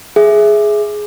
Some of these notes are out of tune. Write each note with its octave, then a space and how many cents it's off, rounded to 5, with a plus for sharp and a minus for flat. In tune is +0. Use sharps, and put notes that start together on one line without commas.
G#4 +10 E5 +0